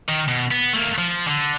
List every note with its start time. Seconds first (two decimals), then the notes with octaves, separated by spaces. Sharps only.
0.09 D#3
0.28 B2
0.51 B3
0.73 A3 A#3
0.98 F3
1.27 D3